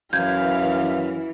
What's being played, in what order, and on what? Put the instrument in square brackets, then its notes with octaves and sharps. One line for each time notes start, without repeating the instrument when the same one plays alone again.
[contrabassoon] F#2 [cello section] E3 [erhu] F5 [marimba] G6 G#6